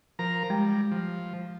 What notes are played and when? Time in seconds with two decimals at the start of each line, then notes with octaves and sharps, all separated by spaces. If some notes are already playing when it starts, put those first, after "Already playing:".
0.19 F3 A#4 A#5
0.50 G3 G#3
0.92 F3